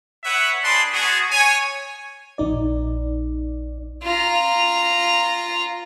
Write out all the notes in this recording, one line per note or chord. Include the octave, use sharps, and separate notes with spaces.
B4 C#5 E5 F#5
D4 G#4 B4 D5 A5 C6
B3 F#4 G#4
C#5 G#5
A#1 D#4 D5
F4 A#5